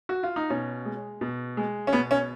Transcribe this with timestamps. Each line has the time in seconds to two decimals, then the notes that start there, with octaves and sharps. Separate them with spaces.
0.09 F#4
0.23 F4
0.36 D#4
0.50 B2 C#4
0.85 G#3
1.21 B2
1.57 G#3
1.87 C#4
1.93 B2 B3
2.11 C#4